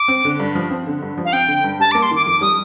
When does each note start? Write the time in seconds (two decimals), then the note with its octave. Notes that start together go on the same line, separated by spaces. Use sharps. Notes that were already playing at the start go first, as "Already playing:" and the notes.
Already playing: D6
0.08 C4
0.25 D3
0.40 G2
0.55 F3
0.71 C4
0.87 D3
1.02 G2
1.17 F3
1.25 F5
1.33 C4 G5
1.48 D3
1.64 G2
1.79 G3 A5
1.92 A#3 D6
2.02 C6
2.11 D#3 D6
2.26 F2 D6
2.41 G3 D#6